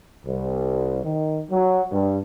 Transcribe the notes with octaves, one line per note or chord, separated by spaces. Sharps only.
C2
D#3
F#3
G2